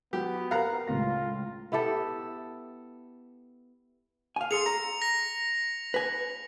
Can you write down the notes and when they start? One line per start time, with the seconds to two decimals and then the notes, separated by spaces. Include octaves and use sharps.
0.13 F#3 B3 G4
0.51 G4 A#4 B4 F5 F#5 A#5
0.88 C#2 A2 F4 A#6
1.72 B3 E4 G4 A4
4.36 F5 G#5
4.51 G#4 A4 C6 C#7 F7
4.66 A#5
5.02 A#6
5.94 B4 G#5